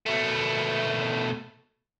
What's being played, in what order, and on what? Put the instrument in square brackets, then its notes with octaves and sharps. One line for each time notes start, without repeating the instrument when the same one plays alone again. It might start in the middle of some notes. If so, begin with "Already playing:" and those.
[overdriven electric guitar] B2 A3